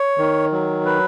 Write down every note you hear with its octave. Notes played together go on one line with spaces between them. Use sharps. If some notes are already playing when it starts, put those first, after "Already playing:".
Already playing: C#5
D#3
F#3
B4